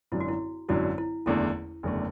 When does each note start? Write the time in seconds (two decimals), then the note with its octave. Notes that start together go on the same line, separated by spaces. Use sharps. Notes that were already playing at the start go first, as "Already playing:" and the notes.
0.12 G#1 F#2 D3 F#3 E4
0.20 F#4
0.28 E4
0.69 G#1 F#2 D3 F#3 E4
0.98 E4
1.26 F#1 E2 D3 A3 E4
1.83 F#1 E2 D3 A3